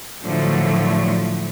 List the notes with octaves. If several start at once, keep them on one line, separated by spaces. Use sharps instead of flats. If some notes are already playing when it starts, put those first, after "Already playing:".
A2 D3 F3 F#3 A3